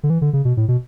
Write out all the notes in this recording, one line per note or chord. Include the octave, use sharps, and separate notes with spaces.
D3
E3
D3
C#3
B2
A2
B2